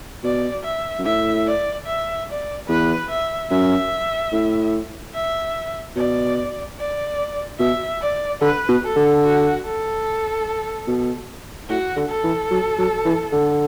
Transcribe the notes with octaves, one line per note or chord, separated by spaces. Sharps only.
B2 D5
E5
F#2
A2 E5
D5
E5
D5
E2 B4
E5
F#2 E5
A2
E5
B2 D5
D5
B2 E5
D5
D3 B4
B2
A4
D3
F#4
A4
B2
A2 F#4
D3
A4
E3
F#3
F#3
E3
D3